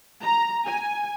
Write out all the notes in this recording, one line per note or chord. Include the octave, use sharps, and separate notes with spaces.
A#5
G#5